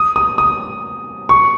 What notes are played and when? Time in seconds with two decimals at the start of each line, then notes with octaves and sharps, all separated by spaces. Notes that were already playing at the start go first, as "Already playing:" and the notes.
Already playing: D#6
0.16 D#6
0.38 D#6
1.29 C#6